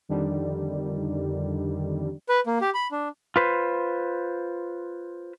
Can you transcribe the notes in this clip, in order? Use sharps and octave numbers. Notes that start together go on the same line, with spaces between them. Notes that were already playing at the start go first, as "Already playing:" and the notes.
F2 D3 D#3 G3
B4
A#3
G4
B5
D4
F4 B4 C5